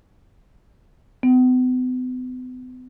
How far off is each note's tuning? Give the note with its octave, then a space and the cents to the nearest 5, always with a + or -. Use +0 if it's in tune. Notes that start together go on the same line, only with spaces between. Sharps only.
B3 +40